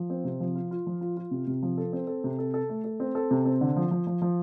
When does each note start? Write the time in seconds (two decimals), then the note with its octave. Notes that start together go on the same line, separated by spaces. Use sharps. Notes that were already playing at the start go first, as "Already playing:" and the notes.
Already playing: F3
0.10 C4
0.24 C3
0.40 F3
0.55 F4
0.71 F4
0.87 F3
1.01 F4
1.17 F4
1.31 C3
1.47 C3
1.63 F3
1.78 A4
1.93 C4
2.07 A4
2.24 C3
2.39 A4
2.54 A4
2.69 A3
2.84 A4
3.00 C4
3.15 A4
3.31 C3
3.45 C4
3.61 D3
3.76 F3
3.91 F3
4.07 F3
4.22 F3